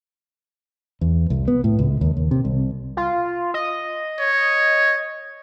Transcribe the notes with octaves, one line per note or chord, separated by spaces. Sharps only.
E2
C2
B3
A2
C#2
D#2
D#2
C3
C2
F4
D#5
C#5